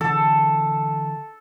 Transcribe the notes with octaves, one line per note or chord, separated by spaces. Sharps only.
D3 E3 A4